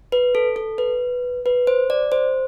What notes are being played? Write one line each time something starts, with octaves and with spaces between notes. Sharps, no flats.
B4
A4
A4
B4
B4
C5
D5
C5